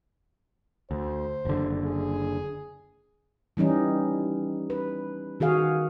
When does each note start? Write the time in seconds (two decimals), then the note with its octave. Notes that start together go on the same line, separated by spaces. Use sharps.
0.91 D2 C5
1.45 F#1 D3
1.83 G#4
3.57 E3 G3 C#4 D#4
4.70 B4
5.40 D#3 F#4 G#4 F5